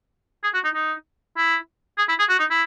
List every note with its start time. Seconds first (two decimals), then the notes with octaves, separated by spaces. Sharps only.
0.44 G#4
0.54 F#4
0.64 D#4
0.75 D#4
1.37 E4
1.98 G#4
2.09 E4
2.19 G#4
2.29 F#4
2.40 D#4
2.50 E4